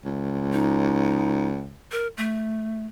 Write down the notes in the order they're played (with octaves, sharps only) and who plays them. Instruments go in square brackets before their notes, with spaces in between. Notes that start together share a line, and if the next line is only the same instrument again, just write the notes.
[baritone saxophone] C#2
[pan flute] D#4
A#4
A3